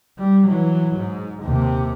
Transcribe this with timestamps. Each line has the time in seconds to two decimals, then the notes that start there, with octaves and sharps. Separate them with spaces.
0.19 G3
0.48 E3 F#3
0.96 G#2
1.43 D#2 C3